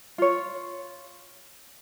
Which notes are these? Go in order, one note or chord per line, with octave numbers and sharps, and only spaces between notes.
F4 C#5